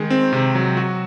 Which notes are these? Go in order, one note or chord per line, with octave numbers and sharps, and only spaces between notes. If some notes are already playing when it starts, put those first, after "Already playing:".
Already playing: D#3 G#3
C4
C3
F#3
F#4